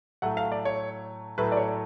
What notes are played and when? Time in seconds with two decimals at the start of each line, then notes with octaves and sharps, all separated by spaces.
0.22 A2 F#3 A3 F#5
0.37 F5
0.52 D5
0.65 C#5
1.38 A2 F#3 A3 B4
1.52 D5
1.57 C#5